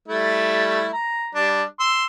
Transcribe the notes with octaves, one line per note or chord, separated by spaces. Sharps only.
G3 A3 E4
A#5
G3 D4
C6 E6